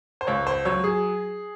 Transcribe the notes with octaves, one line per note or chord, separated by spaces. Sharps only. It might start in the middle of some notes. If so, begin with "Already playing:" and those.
C5
C#2 C#5
C5
F#3 C#5
G#4